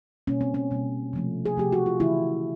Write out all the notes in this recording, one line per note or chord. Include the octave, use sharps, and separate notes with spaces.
B2 G3 A#3 C#4
C4
C#4
B2 G3 A#3
C3 F3 A3
G#4
C3 F3 A3 G4
F#4
F4
C#3 E3 A3 E4